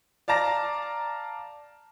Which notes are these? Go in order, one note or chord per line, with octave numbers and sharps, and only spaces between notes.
D5 F5 A5 A#5 A#6